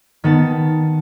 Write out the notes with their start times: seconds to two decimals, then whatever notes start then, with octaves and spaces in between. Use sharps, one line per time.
0.24 D#3 B3 A5